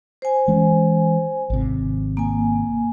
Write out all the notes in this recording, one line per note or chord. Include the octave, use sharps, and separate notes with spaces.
C5 G#5
E3 G#3 C#4
G#1 C3
A#3 G#5